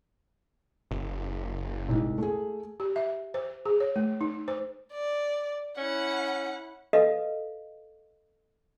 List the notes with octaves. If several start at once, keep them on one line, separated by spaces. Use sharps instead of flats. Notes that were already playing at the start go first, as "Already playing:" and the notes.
F#1
C2 G#2
A3 G#4
G4
E5
C5
G#4
C#5
A3
D#4
C5
D5
C#4 E4 F#5
A4 B4 D#5 F5